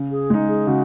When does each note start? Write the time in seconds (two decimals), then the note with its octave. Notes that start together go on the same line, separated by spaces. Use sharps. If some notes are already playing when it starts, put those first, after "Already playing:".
Already playing: C#3
0.11 G#4
0.30 G#3 D#4
0.48 G#4
0.67 C#3 F#4